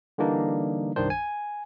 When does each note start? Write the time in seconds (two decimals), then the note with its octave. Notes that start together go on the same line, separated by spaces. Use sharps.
0.18 D3 E3 G3 A#3 D4 D#4
0.96 C2 G2 D#3 D4 C5
1.10 G#5